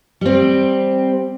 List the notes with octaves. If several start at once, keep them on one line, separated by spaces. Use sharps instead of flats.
G3 C4